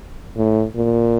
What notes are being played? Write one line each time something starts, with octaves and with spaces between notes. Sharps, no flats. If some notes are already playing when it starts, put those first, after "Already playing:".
A2
A#2